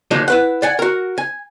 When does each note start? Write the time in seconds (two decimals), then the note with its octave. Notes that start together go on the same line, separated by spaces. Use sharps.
0.11 D3 F3 F#3 G#3 A#3 D#4
0.28 E4 B4 F#5
0.62 D5 F#5 G#5
0.79 F#4 A#4
1.18 G#5